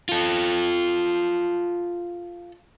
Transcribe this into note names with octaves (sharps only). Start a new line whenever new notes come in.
F4 A4